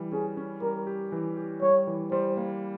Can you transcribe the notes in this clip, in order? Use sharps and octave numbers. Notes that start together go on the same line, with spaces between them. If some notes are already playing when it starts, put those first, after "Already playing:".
Already playing: E3 G3
C#4 G#4
C#4
G3 A#4
G4
E3
G4
G3 C#5
E3
G3 C5
A#3